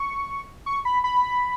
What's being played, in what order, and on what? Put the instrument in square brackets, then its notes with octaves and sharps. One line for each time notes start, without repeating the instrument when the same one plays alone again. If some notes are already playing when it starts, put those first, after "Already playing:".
Already playing: [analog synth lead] C#6
C#6
B5
B5